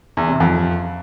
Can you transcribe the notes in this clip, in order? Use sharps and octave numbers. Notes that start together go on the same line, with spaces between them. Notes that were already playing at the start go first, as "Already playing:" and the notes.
E2
C3
F2